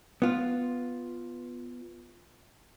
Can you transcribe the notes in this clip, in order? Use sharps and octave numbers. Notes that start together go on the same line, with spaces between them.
B3 F4